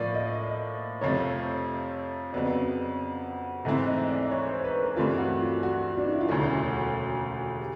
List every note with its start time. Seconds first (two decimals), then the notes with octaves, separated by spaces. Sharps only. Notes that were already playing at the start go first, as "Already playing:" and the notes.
Already playing: A2 F3 A#3 D5
0.14 D#5
1.01 F2 C3 F3 A3 C4 C#5
2.33 F2 C#3 F#3 B3 D5
3.65 G#2 E3 A3 C4 E4 D#5
3.87 D#5
4.09 D5
4.31 C#5
4.47 C5
4.64 B4
4.81 A#4
4.96 G2 E3 A3 C4 F4
5.18 F#4
5.40 F4
5.63 F#4
5.97 D4
6.04 D#4
6.13 E4
6.21 F4
6.28 E1 D2 C#3 F#3 A3 F#4
7.60 G4